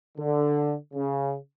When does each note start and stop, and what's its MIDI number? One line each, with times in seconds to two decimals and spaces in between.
0.18 0.74 50
0.94 1.35 49